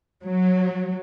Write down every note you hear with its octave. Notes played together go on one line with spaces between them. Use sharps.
F#3